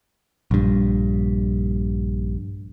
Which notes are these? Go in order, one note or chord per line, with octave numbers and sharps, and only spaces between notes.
A#1 G2